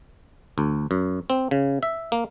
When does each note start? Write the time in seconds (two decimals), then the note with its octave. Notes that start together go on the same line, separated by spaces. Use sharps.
0.58 D2
0.91 F#2
1.30 C4
1.51 C#3
1.83 E5
2.12 A#3